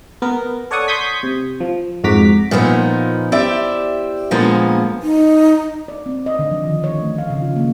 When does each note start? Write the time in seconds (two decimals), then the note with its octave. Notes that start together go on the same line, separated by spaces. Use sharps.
0.22 B3 A#4
0.71 A4 C#5 D5 F#5 C#6 D#6
0.88 C6 C#6 D#6 G6 G#6 B6
1.23 C3
1.60 F3
2.04 F2 G#2 F#4 A#5 D6 B6
2.51 A#2 F3 B3 D#4
3.32 E4 G4 C5 D5 E5
4.31 A#2 D3 F3 G#3 A#3 B3
5.02 D#4
5.88 D5
6.06 C4
6.26 D#5
6.39 D3
6.51 F3
6.64 D#3
6.84 C#5
7.01 A3
7.18 F5
7.30 C#3
7.42 F4
7.56 A#3